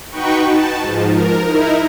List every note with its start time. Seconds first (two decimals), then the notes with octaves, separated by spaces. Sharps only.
0.10 D#4 F#4 B4 G5 C#6
0.46 A5
0.79 G#2 F3
1.08 A#4
1.45 D#4 E4 A#4